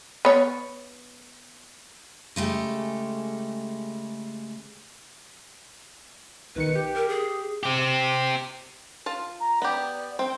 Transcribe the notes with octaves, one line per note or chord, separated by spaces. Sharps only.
B3 C#5
C#3 G#3 A3 G4
B1 D#3 B4 C#7
G4
A#4
G#4
C4 G4
F4 A5
A#5
B3 G4 D5
C4 G5